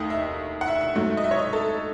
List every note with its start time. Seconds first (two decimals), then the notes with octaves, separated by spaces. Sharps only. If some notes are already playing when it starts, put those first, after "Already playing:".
Already playing: D#2 D#3 A3 D#5
0.10 E5
0.61 F#5
0.67 E5
0.81 E5
0.95 G#2 F#3 A3
1.17 D#5
1.24 E5
1.31 C#5
1.39 D#5
1.53 A4